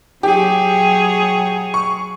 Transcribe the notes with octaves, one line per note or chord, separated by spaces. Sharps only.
F#3 G4 G#4 C#5
C#6